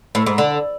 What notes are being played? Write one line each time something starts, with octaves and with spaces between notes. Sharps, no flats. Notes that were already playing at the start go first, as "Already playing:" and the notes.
A2
G#2
D3